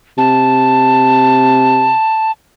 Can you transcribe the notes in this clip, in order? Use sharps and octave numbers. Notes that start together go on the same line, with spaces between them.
C3 A5